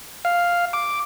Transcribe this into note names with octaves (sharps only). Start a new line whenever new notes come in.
F5
D6